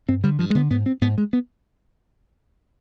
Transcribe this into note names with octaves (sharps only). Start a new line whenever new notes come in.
G2 C4
D3 G3
G2 F3
G#3
D3 B3
G#2 B3
C4
G#2 B3
G#3
B3